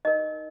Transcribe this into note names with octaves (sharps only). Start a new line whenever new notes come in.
D#4 A#4 D#5